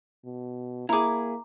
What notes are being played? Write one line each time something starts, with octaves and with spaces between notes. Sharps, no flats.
B2
A#3 E4 G#4 A#5 D6